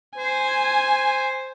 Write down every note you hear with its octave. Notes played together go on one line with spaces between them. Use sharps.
C5 G#5